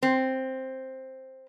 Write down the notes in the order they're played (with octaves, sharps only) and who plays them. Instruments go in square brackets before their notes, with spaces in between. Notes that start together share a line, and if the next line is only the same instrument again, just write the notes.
[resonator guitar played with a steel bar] C4